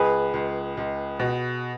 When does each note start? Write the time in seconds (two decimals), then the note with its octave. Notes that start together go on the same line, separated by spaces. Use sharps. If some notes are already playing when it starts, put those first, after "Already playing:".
Already playing: C#2 G#4 B4
0.34 C#2
0.77 C#2
1.19 B2